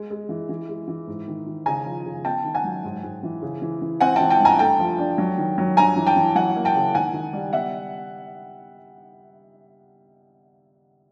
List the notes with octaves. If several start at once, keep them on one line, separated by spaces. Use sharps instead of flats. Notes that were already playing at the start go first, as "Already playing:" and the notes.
Already playing: G#3
G#3
E3
E3
G#3
E3
G#2
D#3
D#3
C#3 G#5 A#5
F3
C#3
B3 G5 A5
D#3
F#5 G#5
F#3
G#2
G#2
E3
C#3
E3
E3
C4 F#5 G#5
E3 G5 A5
G5 A5
G2
G#5 A#5
A3 G5 A5
F3
D4
F#3
D#3
F#3
G2 G#5 A#5
E3
G5 A5
E3
F#3 F#5 G#5
A#3
G5 A5
C#3
D#3 F#5 G#5
D#3
G3
B3 E5 F#5